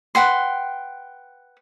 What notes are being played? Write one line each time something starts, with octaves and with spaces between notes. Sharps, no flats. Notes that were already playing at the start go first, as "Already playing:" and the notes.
B4 F#5 G5 C6